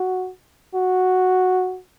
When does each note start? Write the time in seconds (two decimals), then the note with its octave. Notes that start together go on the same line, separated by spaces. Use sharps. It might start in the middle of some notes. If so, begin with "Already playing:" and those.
Already playing: F#4
0.75 F#4